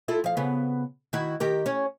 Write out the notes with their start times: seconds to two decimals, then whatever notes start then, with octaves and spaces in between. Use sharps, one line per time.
0.08 E4 F4 A4
0.24 F3 F5
0.37 C#3 B3
1.13 D#3 E4 F#4
1.40 D#3 G4 A#4
1.66 C#4 C#5